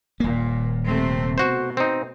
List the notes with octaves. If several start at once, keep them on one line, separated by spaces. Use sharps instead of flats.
D#1 A#2 A#3
C3 A3 C4
B2 F#4 C5
C4 D#4